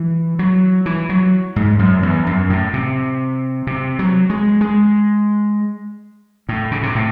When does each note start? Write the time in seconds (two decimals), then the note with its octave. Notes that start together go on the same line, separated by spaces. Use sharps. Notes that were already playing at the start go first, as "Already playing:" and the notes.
Already playing: E3
0.39 F#3
0.86 E3
1.09 F#3
1.56 G#2
1.79 F#2
2.03 E2
2.27 F#2
2.50 A2
2.74 C3
3.67 C3
3.99 F#3
4.30 G#3
4.61 G#3
6.49 A2
6.71 C#3
6.83 C3
6.95 A2